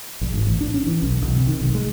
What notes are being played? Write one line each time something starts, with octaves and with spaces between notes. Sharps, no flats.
A#1
G#1
A1
D4
C#4
E3
B1
B1
C3
D#3
B1
G#3